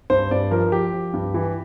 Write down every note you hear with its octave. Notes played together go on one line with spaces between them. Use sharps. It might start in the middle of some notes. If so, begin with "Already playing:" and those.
G2 C5
G2 D5
F3 A#4
F3 G4
F3
G2
E3